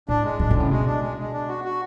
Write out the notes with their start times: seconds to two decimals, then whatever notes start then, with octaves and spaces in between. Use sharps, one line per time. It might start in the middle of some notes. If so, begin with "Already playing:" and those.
0.09 A2 D4
0.24 G#3
0.39 E3 D4
0.51 D3
0.55 A2 C#3
0.71 B2 G#3
0.86 D4
1.02 G#3
1.17 G#3
1.33 D4
1.49 F#4
1.64 F#4